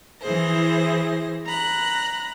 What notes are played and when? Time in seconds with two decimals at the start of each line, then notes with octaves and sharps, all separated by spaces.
0.22 E3 E4 G#4 C5 A#6
1.47 A#5 B5 F#6